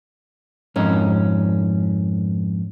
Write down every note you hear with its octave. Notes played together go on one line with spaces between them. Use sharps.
F2 G#2 C#4